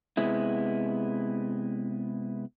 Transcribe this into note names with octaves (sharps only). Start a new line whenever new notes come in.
C3 G#3 B3 E4